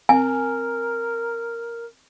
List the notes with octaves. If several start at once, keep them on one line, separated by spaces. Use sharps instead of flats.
C4 A#4 G#5